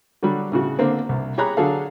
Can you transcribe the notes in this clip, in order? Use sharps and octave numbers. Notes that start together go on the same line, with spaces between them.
D3 F#3 G3
A2 C#3 F#4
D3 A#3 C4
C2
G4 G#4 C#5 A#5 B5 F#6
D3 F#3 G#4 A4 F5